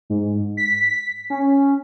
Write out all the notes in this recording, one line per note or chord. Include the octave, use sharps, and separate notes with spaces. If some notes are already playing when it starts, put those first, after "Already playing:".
G#2
B6
C#4